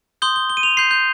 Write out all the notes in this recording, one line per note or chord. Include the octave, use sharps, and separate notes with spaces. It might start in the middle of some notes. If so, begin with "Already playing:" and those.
C6 D#6 G6 G7
G7
G7
D#7
F7
C6 G6 C7
G6